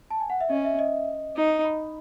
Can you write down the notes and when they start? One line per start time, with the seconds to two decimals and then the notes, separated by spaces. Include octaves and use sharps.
0.10 A5
0.20 G#5
0.30 F#5
0.41 E5
0.50 C#4 D#5
0.65 E5
0.79 D#5
1.36 D#4
1.64 B5